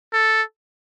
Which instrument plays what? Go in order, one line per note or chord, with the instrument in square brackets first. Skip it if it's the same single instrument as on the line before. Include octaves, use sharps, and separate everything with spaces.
[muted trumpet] A4